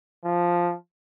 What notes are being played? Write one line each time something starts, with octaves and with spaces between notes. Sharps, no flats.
F3